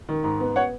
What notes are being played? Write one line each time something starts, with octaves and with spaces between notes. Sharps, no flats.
D#3
G#2
B3
C#5 F#5